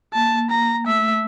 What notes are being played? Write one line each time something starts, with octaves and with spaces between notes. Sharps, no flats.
A#3 A5
A#5
A3 E5